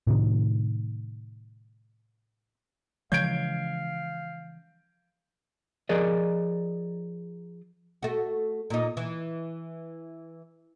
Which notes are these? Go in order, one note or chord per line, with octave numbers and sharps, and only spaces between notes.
A2 C3 D#3
C#3 E3 F3 G#3 F5 G6 G#6 D7
F3 G#4 A#4 D5 D#5
A3 F#4
A#2 D#4
E3